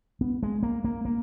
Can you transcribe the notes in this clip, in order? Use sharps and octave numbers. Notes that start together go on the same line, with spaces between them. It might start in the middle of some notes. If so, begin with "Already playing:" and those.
B3
G#3
A#3
A#3
A#3